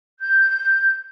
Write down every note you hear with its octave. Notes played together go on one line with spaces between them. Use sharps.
G6